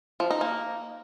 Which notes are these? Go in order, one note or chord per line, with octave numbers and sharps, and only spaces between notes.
F3
D#4
A#3